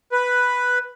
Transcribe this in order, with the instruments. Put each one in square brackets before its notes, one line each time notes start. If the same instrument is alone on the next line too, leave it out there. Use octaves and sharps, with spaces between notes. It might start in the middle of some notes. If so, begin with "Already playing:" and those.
[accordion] B4